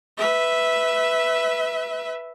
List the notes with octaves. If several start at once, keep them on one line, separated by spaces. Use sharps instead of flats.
B4 E5